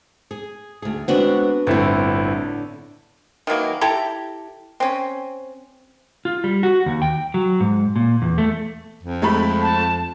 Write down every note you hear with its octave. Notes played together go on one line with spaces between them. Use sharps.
G#4
D2 G#4
G#3 B3 C4 D4 F#4
G1 A2 D3 C4 E4
D#3 E3 F#3 A#3
E4 G4 A4 A#5
C4 C#4
F4
G3
F#4
D#2
G5
F#3
G#2
A#2
E2
A3
F2
G#3 A3 B5
A5